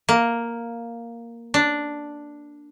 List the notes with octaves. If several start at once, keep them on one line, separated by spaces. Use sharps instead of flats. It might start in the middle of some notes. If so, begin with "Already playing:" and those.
A#3
D4